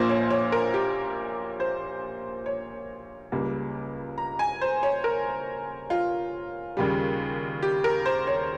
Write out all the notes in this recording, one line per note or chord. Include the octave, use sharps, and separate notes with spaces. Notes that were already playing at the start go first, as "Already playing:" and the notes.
Already playing: A#1 A#2 F3 A#3 C5
C#5
C#5
A#4
G4
C5
C#5
C#2 C#3 G3 A#3
A#5
G#5
C5
C#5
A#4
F4
D#2 C#3 G3
G4
A#4
C5
C#5